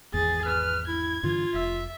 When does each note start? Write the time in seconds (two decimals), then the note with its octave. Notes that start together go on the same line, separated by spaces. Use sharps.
0.14 G#1 E2 G#4 A6
0.45 B4 F6
0.88 E4 G#6
1.23 G2 D3 E3 F4
1.54 F1 E5